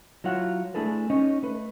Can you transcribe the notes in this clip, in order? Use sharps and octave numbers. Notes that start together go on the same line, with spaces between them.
F#3 E4 F4 C#5 F#5
A3 D4 E4 G#4 A4 B4
C#4 D#4 C#5 D#5
A3 B4